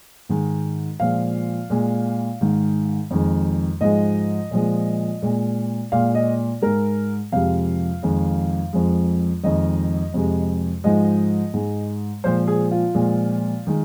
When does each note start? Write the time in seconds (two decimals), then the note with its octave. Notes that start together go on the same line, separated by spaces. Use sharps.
0.29 G#2 D#3 G#3
1.00 A#2 F3 G#3 F5
1.70 A#2 G#3
2.41 G#2 D#3 G#3
3.11 F2 D#3 G#3
3.81 G#2 F3 G#3 D#5
4.51 A#2 F3 G#3
5.22 A#2 G#3
5.92 A#2 G#3 F5
6.15 D#5
6.62 G#2 G#3 A#4
7.32 F2 C3 F3 G#3 F5
8.03 F2 D#3 G#3
8.73 F2 F3 G#3
9.43 F2 D#3 G#3 D#5
10.14 F2 C3 G#3
10.84 G#2 F3 G#3 D#5
11.54 G#2 G#3
12.24 A#2 F3 G#3 C5
12.48 G#4
12.72 F4
12.94 A#2 F3 G#3
13.67 D#3 G#3